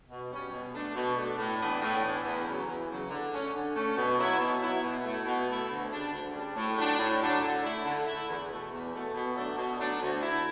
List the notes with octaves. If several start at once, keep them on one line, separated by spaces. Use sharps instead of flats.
B2
G3 C#4
B2
A3 D4
B2
A3 D4
A2
E3 B3 D4
A2
E3 B3 D4
E2
C#3 F#3
E2
C#3 F#3
D3
A3 C#4
D3
A3 C#4
B2
F#3 B3 E4
B2
F#3 B3 E4
B2
A3 E4
B2
A3 E4
D2
C#3 G3 D4
D2
C#3 G3 D4
A2
F#3 A3 D4
A2
F#3 A3 D4
D3
A3 E4
D3
A3 E4
E2
B2 A3
E2
B2 A3
B2
F#3 A3 D4
B2
F#3 A3 D4
D2
D3 A3 E4